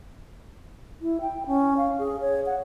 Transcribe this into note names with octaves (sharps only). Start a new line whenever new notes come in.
E4
G5
C#4
F5
G#4
C#5
F#5